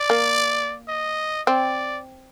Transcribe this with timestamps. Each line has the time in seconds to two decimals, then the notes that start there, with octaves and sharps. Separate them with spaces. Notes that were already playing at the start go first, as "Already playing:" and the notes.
Already playing: D5
0.10 A#3
0.88 D#5
1.47 C4 D5